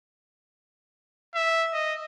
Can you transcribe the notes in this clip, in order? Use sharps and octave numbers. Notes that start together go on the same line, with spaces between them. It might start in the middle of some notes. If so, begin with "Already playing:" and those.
E5
D#5